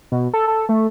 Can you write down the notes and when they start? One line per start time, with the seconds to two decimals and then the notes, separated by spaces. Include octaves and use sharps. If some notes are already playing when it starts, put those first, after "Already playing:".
0.12 B2
0.34 A4
0.48 A4
0.69 A3